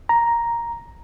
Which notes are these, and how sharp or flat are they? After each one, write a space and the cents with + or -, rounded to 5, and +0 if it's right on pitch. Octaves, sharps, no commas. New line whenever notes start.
A#5 +5